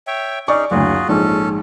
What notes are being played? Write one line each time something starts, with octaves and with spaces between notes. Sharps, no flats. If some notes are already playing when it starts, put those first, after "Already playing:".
C#5 E5 G5
C#4 D#4 G#4 D5 C#6
F#1 D2 F4 F#4 G#4
A#1 G#2 C#4 A4